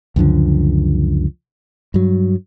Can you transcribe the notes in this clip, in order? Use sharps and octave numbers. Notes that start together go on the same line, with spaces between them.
C#2 F#2 D3 F3
G2 F#3